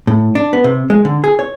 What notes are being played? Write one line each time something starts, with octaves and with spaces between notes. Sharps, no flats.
A2
D4
B3
C3
G#3
D3
G#4
C#5